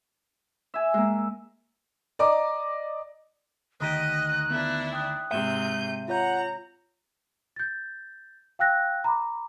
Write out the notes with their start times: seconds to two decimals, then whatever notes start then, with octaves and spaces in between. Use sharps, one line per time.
0.74 E5 G#5
0.94 G#3 A#3
2.19 D5 D#5 A#5 D6
3.81 D2 D#3 G4 D#5 D#6 F#6 A#6
4.51 B3 D4 E4
4.92 G5 D#6 F#6
5.31 G#2 C3 E5 G6 D#7
6.08 F4 C#5 F#5 A#5 G6
7.56 G6 A6
8.59 F5 G5 E6 F#6 A#6
9.04 A#5 B5 D6